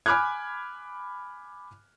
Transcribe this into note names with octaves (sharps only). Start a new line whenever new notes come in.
G#5 B5 D6 F6 F#6 G#6